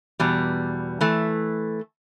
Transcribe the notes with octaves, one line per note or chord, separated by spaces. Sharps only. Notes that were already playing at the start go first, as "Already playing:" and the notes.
E2 B2 G3
E3 A3